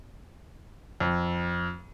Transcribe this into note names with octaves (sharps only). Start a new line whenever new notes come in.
F2